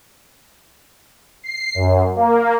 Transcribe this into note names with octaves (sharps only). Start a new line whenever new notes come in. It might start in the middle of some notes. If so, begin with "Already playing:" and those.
C7
F#2
A#3